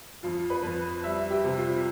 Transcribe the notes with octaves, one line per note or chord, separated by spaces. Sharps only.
F2 F4
B4
F2
G3 E5
G4
C3
F4